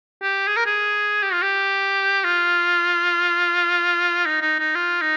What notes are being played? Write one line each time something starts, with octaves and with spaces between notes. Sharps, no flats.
G4
G#4
A#4
G#4
G4
F4
G4
F4
D#4
D#4
D#4
F4
D#4